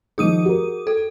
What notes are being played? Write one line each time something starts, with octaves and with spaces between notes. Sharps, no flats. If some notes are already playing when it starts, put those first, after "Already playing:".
D#3 F3 G#4 D#6 D#7
F#4 A#4
A4